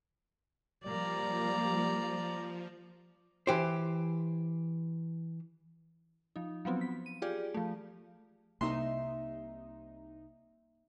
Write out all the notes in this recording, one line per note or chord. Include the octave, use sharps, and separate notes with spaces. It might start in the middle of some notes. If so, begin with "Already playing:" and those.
F3 G3 A#3 D5 A#5
E3 G4 C5
F3 D#4
F3 F#3 B3 C4
B6
D#7
F4 G4 G#4 D5
F3 A3
C2 C3 A#3 D#4 E5 C6